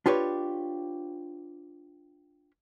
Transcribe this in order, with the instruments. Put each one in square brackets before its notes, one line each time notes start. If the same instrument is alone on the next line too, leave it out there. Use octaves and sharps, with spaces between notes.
[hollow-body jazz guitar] D4 F4 G4 B4 C#5